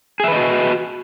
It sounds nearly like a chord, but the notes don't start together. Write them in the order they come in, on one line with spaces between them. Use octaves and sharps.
G#4 E5 B4 D#5 F#4